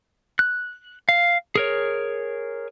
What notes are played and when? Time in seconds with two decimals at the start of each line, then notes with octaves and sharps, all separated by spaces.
0.39 F#6
1.09 F5
1.55 G#4 A#4 C#5